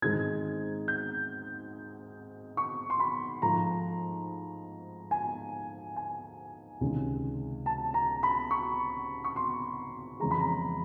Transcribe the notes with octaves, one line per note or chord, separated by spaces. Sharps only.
G#2 D#3 G#3 C4 D#4 G#6
G6
C#6
C6
B5
G#2 F3 A3 A#5
G#5
G#5
C#2 C3 D#3 G#3 C#4
A5
A#5
B5
C#6
C#6
C6
F2 C#3 E3 G#3 A#5
B5
A#5